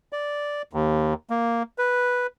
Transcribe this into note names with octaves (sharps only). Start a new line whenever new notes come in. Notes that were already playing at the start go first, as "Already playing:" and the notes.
D5
D#2
A#3
B4